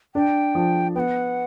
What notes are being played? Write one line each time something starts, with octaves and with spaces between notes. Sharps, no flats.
D4 G5
F3
B3 F#5 G5